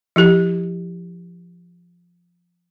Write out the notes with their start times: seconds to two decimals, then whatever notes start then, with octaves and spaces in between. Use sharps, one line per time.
0.16 F3 E4 G4